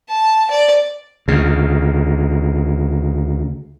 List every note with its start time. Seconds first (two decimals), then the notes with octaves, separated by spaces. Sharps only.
0.10 A5
0.51 D5
1.28 D2 C#3